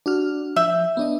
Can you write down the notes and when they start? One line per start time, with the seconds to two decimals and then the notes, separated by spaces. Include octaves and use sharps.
0.06 D4 F#4 F6
0.56 F3 E5 G6
0.97 B3 D4 D#5